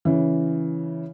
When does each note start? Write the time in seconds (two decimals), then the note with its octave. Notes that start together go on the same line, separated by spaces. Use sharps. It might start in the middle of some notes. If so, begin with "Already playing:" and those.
0.05 C#3 E3